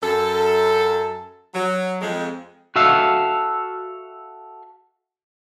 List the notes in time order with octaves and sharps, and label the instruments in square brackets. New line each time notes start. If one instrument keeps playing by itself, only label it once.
[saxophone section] F#2 A4
F#3
F2 G#3
[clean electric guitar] F#4 A4 E5 F5